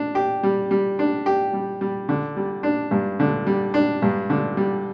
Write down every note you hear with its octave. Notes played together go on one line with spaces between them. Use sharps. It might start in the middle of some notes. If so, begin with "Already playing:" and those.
Already playing: D4
G4
G3
G3
D4
G4
G3
G3
D3
G3
D4
G2
D3
G3
D4
G2
D3
G3